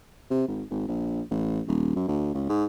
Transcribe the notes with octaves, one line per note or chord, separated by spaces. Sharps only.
C3
G#1
G#1
A#1
A1
D#1
F#2
D2
C#2
G#2